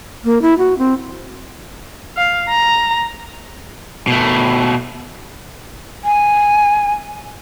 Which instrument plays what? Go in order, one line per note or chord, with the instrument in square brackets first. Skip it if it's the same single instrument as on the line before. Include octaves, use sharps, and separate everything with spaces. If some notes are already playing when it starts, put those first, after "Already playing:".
[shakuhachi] A#3
E4
F#4
C4
[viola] F5
A#5
[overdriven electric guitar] B2 A3
[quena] G#5